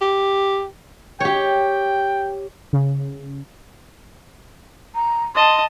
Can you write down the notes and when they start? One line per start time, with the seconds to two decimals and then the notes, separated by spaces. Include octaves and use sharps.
0.02 G4
1.20 G4 C#5 G5
2.73 C#3
4.95 A#5
5.35 D#5 A5 C6